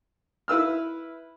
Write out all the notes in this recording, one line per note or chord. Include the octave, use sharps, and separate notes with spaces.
E4 B4 E6 F6